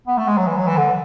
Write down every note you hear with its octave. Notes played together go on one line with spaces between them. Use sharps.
B3
A3
G#3
F#3
E3
F#3
E3
D3